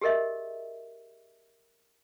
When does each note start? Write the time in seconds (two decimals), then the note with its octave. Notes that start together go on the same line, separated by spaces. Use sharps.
0.01 G4 G#4 A#4 D#5 E5